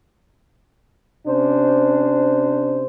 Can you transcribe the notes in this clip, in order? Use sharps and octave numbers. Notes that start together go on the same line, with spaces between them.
C3 C#4 D4 C5